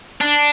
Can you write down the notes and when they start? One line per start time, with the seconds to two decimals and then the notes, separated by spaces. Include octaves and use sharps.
0.21 D4